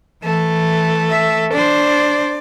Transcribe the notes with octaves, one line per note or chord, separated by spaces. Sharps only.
E3 A3
E5
D4 C5 D5